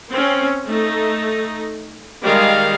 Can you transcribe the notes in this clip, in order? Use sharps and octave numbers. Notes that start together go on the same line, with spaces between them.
C4 C#4
A3 D#4
D#3 G3 G#3 F5